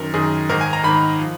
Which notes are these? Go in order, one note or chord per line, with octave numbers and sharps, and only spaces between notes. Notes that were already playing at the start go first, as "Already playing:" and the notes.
Already playing: F#2 D#3 A#4
F#2 D#3 G#4
G#2 D#3 A#4
G#5
A#5
G#2 D#3 B5
F3